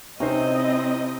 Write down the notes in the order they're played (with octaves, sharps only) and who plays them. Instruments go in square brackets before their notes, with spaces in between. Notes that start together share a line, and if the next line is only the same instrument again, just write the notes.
[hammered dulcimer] C3 [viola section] C4 E4 D#5 [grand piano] C#4 D#4 C5